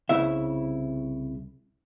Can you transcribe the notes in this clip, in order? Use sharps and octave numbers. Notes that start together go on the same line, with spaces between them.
C2 C#3 E4 E5